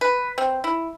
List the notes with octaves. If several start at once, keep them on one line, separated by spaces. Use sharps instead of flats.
B4
C4
E4